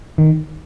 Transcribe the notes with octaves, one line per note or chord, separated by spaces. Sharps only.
D#3